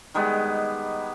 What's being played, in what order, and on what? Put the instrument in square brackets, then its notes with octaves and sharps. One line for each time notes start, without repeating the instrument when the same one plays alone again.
[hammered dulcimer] D#3 G3 G#3 B3